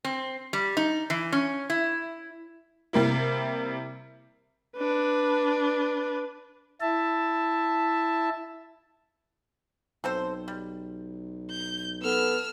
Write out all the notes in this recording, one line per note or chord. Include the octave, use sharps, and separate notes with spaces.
C4
G3
D#4
E3
C#4
E4
C3 G3 A#3 E4
D4 B4
E4 E5 A5
B1 C4 A4 C5
G3
G6
B3 A4 E6 F6